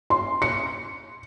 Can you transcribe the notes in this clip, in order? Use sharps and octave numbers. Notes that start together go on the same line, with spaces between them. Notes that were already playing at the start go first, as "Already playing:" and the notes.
C6
C#7